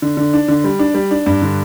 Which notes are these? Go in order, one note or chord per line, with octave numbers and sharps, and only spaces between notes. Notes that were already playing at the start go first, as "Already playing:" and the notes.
D3
D3
D4
D3
G3
D4
G3
D4
G2
D3